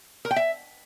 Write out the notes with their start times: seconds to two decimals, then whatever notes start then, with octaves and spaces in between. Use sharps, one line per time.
0.25 A#4
0.31 G5
0.36 E5